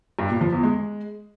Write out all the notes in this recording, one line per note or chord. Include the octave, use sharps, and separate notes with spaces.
G2
A#2
F3
E2
G#3